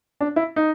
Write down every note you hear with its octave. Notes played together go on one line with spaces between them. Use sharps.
D4
E4
D#4